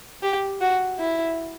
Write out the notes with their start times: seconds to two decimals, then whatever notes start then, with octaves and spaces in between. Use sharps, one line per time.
0.23 G4
0.61 F#4
0.99 E4